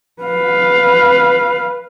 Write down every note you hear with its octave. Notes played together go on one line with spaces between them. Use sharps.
B4 F5